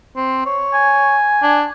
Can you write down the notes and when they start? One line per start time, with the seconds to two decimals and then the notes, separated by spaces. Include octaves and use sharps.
0.16 C4
0.46 C#5
0.74 G#5
1.43 D4